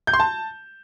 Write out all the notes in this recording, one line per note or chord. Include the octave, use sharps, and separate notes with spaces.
G6
C6
A5